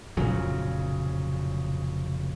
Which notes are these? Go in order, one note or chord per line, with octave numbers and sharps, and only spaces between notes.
F1 A#2 C#3 F#3